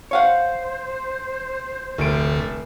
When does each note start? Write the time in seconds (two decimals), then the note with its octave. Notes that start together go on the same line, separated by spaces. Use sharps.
0.11 C5 C#5 F5 F#5
1.98 F1 D2 A3 D7